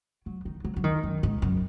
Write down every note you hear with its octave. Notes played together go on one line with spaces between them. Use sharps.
F#3
D#3
F#3
F#3
D#3
F#2
G#2
F#2